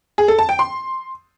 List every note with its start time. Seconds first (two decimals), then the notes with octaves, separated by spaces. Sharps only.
0.18 G#4
0.28 A4
0.39 A5
0.49 G5
0.59 C6